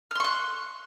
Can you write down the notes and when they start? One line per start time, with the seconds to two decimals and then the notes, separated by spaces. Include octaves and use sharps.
0.11 F6
0.15 C6
0.20 C#6
0.24 F#6